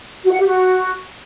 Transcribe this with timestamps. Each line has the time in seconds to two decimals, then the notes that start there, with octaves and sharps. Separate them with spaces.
0.24 F#4
0.32 F#5
0.39 G4
0.46 F#4